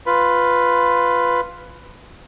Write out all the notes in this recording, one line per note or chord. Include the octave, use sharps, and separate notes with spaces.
F4 B4